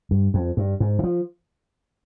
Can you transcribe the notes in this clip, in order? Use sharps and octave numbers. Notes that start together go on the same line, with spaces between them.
G2
F2
G2
G#2
D#3
F3